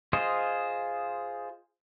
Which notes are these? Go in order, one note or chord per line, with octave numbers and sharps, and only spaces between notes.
F4 G#4 C5 D#5